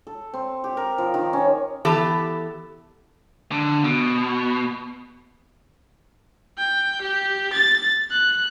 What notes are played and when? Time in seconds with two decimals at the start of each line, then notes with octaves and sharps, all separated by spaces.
0.07 A4
0.34 C4
0.64 G4
0.77 A#4
0.98 F3
1.14 D#3
1.33 C#4
1.85 E3 B3 G4 A4 A5
3.52 D3
3.84 B2
6.58 G5
7.02 G4
7.53 A6
8.11 F#6